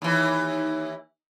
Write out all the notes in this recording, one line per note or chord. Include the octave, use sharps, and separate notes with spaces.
D#2 E3